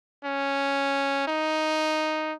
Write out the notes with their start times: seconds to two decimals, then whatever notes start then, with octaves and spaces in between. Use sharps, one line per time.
0.25 C#4
1.28 D#4